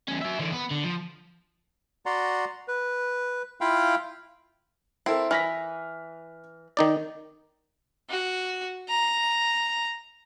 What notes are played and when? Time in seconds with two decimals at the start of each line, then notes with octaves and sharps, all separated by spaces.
0.09 E2 C#4
0.22 F#3 E5
0.39 D3 E3
0.52 B3
0.71 D3
0.84 F3
2.06 F#4 D5 F#5 A#5 C6
2.68 B4
3.61 E4 F4 F5 G5 B5
5.06 C4 E4 A4 A#4
5.31 E3 F6 A#6 B6
6.77 D#3 D#4 D5
8.10 F#4
8.89 A#5